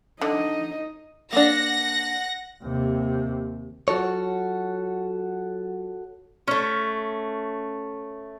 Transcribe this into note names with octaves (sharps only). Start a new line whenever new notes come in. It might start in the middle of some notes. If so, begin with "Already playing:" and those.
D3 D#4 D#5
A#3 D4 F#5 A#6
D#2 C3
F#3 F4 F#4 A4 C#5 F#5
A3 C#4